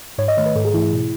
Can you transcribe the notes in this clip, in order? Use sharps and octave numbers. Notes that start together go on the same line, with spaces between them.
G#2 C#5
D#5
D#3 A3 C#5
B4
G#2 A4
G#4
E3 A3 E4
E4
B2